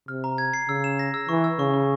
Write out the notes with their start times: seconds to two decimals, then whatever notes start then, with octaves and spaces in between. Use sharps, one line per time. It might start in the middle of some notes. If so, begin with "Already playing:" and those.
0.08 C3 F6
0.24 A#5
0.38 G#6
0.54 C7
0.68 C#3 E6
0.84 E7
0.99 A#6
1.14 E6
1.29 E3 C#6
1.44 E6
1.59 C#3 C#6
1.74 C#6